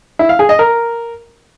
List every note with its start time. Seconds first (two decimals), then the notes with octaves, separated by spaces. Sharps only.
0.19 E4
0.29 F5
0.39 G#4
0.49 D#5
0.59 A#4